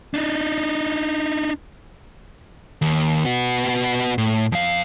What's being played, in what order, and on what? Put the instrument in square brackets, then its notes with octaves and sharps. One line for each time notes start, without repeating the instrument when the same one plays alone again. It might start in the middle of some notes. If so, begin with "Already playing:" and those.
[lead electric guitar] D4 D#4
D#2
B3 F#4
A2
F2 F5